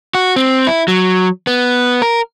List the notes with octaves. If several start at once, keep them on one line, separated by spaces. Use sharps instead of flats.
F#4
C4
E4
F#3
B3
A#4